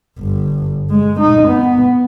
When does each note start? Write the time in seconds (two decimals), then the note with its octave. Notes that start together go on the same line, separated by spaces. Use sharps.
0.19 G1
0.90 G#3
1.19 D#4
1.48 B3